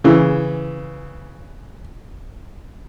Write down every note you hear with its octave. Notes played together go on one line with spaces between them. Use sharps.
C#3 E3